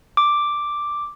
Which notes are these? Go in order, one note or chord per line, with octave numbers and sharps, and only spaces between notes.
D6